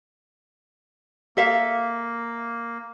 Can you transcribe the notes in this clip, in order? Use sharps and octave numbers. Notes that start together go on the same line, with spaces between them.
A#3 A4 E5 F5